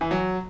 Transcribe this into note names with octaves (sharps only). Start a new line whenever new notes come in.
E3
F#3